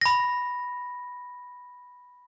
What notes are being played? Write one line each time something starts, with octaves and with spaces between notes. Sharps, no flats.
B5 A#6